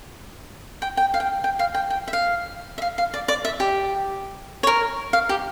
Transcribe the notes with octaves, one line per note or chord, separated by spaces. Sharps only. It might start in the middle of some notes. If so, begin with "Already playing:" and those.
G5
G5
F5
G5
G5
F5
G5
G5
E5
F5
E5
F5
F5
D5
D5
E5
G4
C#5
A#4
F5
G4